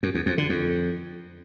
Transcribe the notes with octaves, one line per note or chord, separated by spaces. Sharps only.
F#2
E2
F2
D3
F2